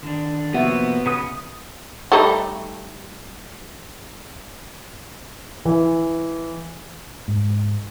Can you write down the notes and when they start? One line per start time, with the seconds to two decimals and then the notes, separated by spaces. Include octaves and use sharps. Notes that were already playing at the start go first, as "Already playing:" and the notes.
0.03 D3 D#3 D4
0.54 C3 F3 A#3 B3 F#4 E5
1.06 C#3 B3 D#6
2.12 G3 A3 D#4
5.65 E3
7.28 G#2